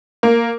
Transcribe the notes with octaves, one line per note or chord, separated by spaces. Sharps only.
A#3